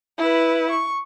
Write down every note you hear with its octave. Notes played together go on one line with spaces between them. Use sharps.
E4 B4
C#6